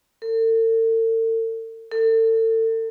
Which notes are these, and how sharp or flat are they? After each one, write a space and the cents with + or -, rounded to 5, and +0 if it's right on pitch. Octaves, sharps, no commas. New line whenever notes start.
A4 +45
A4 +35